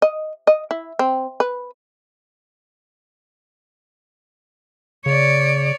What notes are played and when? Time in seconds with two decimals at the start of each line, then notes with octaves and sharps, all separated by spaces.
0.02 D#5
0.47 D#5
0.71 E4
0.99 C4
1.40 B4
5.06 C#3 C#5 D5